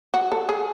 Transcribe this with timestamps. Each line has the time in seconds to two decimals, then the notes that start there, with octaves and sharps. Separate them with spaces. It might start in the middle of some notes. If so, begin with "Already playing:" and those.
0.14 F#4
0.32 A4
0.49 G#4